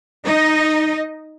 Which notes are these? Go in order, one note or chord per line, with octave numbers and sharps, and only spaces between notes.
D#4 D#5